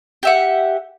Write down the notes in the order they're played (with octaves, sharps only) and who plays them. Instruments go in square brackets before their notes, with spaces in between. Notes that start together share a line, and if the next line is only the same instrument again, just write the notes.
[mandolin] G4 E5 F#5